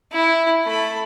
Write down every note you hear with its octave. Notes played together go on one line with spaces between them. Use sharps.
E4
A3 B5